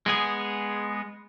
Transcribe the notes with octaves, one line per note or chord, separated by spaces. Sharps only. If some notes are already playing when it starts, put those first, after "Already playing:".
G#3 B3 G#4